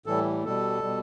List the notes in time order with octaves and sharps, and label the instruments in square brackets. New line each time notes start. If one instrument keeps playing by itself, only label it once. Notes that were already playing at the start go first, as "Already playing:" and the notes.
[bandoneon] A2 E3 G3 A4
B2 G3 A4
B2 G3